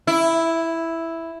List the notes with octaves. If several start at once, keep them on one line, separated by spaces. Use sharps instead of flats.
E4